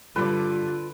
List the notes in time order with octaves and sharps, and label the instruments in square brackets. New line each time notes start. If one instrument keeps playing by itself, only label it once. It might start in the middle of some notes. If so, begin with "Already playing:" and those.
[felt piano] G2 G3 [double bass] D3 [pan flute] F4 [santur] B4 D6